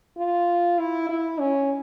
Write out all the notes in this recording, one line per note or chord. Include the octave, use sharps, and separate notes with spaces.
F4
E4
E4
C#4